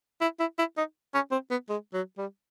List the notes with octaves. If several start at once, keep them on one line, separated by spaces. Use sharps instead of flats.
E4
E4
E4
D#4
C#4
C4
B3
G#3
F#3
G3